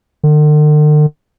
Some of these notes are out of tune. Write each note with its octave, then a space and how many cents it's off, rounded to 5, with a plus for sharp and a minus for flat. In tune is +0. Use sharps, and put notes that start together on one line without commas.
D3 +45